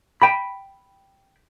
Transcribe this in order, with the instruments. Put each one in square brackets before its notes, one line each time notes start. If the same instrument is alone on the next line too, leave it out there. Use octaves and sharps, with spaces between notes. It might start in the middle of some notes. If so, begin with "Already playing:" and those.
[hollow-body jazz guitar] G5 B5